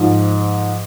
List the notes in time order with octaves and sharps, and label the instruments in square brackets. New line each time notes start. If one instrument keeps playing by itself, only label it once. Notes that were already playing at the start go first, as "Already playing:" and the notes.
Already playing: [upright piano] G#2 F3